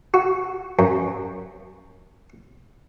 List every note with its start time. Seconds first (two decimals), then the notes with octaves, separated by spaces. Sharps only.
0.14 F#4
0.79 F#2